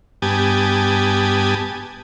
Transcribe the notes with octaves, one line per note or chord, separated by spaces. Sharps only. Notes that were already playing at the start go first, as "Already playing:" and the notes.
G2 B3 G4 G#5 A5 D#6